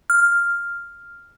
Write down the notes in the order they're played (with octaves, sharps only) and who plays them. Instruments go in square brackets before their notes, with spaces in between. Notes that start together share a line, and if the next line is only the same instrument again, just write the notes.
[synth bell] F6